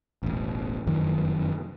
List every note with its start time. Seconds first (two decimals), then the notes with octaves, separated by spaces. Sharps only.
0.23 E1 A1
0.87 F1 F#2 D#3 E3